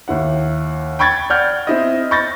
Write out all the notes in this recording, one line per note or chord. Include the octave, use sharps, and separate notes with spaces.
D#2 E4 F#5
G5 B5 C#6 G#6 A6
D5 F#5 F6 G6
C4 E4 D#5
B5 C#6 G6 A6 A#6